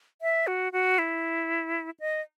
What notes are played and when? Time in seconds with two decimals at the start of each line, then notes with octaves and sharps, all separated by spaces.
0.22 E5
0.47 F#4
0.72 F#4
0.99 E4
2.00 D#5